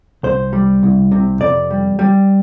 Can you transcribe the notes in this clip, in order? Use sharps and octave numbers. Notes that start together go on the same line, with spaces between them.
C2 C5
G3
C2
C3
F2 D5
G3
G3